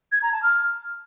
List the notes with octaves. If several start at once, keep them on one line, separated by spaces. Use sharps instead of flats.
G#6
A#5
A5
F6